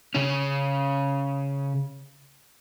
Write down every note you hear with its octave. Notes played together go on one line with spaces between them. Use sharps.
C#3 C#4